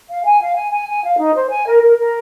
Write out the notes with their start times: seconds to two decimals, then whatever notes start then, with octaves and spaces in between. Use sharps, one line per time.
0.09 F5
0.24 G#5
0.41 F5
0.55 G#5
0.71 G#5
0.87 G#5
1.03 F5
1.18 D#4
1.35 C5
1.50 G#5
1.66 A#4
1.82 A#4
1.98 A#4